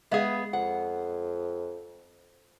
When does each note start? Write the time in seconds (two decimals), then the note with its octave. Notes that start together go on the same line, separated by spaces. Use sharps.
0.11 G#3 B3 G#4 D#5 F5
0.53 F2 F#5